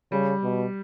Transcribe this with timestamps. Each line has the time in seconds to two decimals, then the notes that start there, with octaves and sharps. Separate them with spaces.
0.11 C#3 G3
0.43 B2